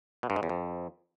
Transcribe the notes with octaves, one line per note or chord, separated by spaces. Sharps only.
B2
G2
G#2
E2
F2